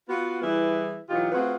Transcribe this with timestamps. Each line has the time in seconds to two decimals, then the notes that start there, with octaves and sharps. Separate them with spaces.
0.08 B3 F4 F#4
0.41 E3 G3 E4 G#4 B4
1.09 B2 E3 F#3 D#4 F4 G4
1.32 A3 C4 F4 F#4 G#4 B4